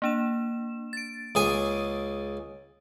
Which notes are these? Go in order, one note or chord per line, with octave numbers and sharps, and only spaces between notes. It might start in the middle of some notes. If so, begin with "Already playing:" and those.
A#3 D4 E7
A6 D7
C#2 G#4 G#5